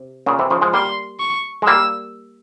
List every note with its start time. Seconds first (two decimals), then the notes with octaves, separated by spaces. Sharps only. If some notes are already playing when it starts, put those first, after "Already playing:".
Already playing: C3
0.26 A#2 C#3
0.39 C3 E3
0.50 C#3 F3
0.61 F3 G#3
0.73 G3 A#3 C6
1.20 C#6
1.62 G#3
1.67 G3 A#3 E6